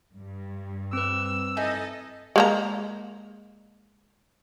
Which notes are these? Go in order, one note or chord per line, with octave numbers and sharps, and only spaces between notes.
G2
C4 B4 E6
D#4 E4 A4 D#5 G#5
G#3 A#3 A#5